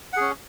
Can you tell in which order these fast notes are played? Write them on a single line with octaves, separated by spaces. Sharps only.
F#5 G#4 C#4